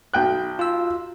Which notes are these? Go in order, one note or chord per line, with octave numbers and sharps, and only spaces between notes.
B1 G5 F#6
F4 E6